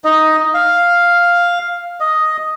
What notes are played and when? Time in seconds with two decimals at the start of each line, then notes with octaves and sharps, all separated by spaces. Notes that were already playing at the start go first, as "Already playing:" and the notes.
0.04 D#4 D#5
0.54 F5
2.00 D#5